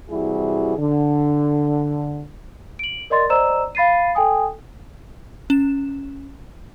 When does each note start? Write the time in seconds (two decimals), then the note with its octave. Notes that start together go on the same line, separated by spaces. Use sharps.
0.10 C3 E3 G3 E4 F#4 G#4
0.78 D3
2.79 D7 F#7
3.10 A#4 D5 D#5 C6 A6
3.29 C5 D5 D#5 A#5 E6 E7
3.75 F5 B5 A6 C7 D#7
4.15 A4 G5 G#5 D#6
5.50 C#4 E7